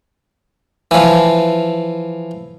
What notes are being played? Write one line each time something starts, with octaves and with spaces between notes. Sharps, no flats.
E3 F3